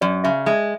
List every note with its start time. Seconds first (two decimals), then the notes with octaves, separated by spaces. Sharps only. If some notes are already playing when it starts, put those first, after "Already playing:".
0.01 F#2 D5
0.24 C#3 E5
0.46 G#3 E5